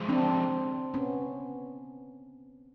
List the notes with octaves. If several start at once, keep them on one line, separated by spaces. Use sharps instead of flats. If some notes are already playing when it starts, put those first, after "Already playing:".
Already playing: F3 G#3 C#4 F4 G#4
C4 D4
B3 C#4